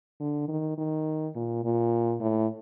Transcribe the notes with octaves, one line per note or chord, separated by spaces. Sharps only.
D3
D#3
D#3
A#2
A#2
A2